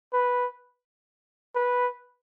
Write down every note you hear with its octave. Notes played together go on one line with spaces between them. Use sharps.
B4
B4